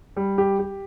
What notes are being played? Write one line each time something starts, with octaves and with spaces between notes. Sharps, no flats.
G3
G4
G4